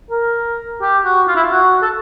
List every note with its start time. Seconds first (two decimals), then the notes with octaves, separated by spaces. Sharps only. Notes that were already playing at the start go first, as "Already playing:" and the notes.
0.10 A#4
0.82 G4
1.05 F#4
1.28 F4
1.36 E4
1.44 F4
1.51 F#4
1.83 A4